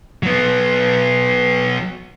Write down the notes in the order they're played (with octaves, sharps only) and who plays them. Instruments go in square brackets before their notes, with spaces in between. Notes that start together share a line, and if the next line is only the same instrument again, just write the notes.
[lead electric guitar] F#3 B3